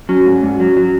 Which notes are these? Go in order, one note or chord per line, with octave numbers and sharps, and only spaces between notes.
F#3 C#4
G#2
G#2
F#3
F#3